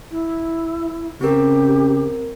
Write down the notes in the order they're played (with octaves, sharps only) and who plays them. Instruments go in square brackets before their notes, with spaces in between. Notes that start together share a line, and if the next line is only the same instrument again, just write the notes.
[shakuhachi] E4
[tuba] C#3 [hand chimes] C4 A#4 [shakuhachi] G4